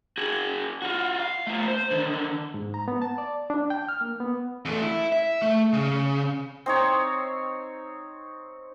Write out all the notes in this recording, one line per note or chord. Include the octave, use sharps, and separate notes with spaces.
F#4 G#4
F4 F#4
F5
A3 F4
C5
D3 D#3
G#2
A#5
B3
A5
D5
D4
G5
F6
A#3
B3
E2 A3
E4
E5
A3
C#3
C4 D#4 C#5